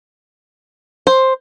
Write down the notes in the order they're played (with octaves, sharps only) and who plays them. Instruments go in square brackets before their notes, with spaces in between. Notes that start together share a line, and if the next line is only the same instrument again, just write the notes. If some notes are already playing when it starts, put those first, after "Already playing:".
[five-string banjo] C5